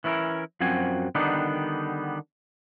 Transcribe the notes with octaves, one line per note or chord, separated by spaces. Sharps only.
E3 C#4 E4 A4 A#4
F#2 F3 C4 F#4 G#5
D3 D#3 G3 B3 D4 D#4